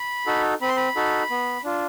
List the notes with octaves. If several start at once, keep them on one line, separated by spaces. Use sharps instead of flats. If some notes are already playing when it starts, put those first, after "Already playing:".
Already playing: B5
D#4 F#4 A4
C4 B5
C6
B5
D#4 F#4 A4
B3
D4 F4